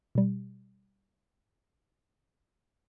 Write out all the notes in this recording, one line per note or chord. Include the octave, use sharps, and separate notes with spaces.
B2 G3